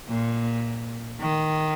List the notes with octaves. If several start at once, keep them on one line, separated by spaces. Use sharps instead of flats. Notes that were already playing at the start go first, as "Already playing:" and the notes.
A#2
D#3